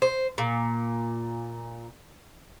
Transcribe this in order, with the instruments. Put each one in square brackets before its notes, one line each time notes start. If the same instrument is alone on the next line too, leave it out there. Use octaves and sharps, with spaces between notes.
[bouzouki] C5
A#2